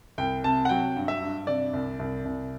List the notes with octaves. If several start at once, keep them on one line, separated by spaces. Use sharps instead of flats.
C2 G5
C3 A5
F#5
F#3 G5
G2
E5
G2
C3 D5
C2
C2
C2